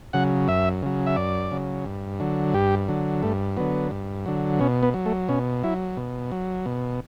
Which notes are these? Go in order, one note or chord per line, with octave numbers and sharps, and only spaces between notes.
C#3 F#3 F#5
F#2 E5
C#3 F#3
E5
F#2 D5
C#3 F#3
G2
D3 F#3
G2 G4
D3 F#3
G2 A3
D3 F#3 B3
G2
D3 F#3
B2 C#4
B3
F#3
A3
B2 C#4
F#3 E4
B2
F#3
B2